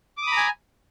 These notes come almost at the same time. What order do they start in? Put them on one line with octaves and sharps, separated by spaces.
D6 D#6 B5 A#5 G#5